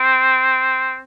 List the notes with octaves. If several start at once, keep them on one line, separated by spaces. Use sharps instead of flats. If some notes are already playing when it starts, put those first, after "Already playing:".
Already playing: C4